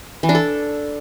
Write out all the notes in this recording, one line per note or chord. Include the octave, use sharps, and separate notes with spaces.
E3
D4
A4